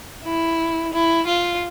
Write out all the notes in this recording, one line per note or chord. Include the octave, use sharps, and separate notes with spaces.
E4
E4
F4